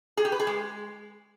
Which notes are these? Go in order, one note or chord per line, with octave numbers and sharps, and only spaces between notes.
G#4
G4
B4
G#4
G#3